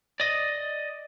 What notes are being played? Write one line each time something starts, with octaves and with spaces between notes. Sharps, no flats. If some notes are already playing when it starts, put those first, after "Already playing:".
D5 D#5